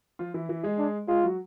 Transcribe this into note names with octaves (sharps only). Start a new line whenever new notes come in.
F3 F4
E3 E4
E3 E4
G#3 G#4
D4
G#3 F4 G#4
F#3 F#4